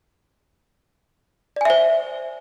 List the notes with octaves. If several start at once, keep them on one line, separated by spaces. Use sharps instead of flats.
C5 D5 E5 G#5